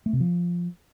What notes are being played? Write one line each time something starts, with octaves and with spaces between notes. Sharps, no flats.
A3
C3
F3